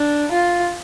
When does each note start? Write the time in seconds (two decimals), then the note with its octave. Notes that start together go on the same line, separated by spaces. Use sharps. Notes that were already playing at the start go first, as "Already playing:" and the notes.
Already playing: D4
0.31 F4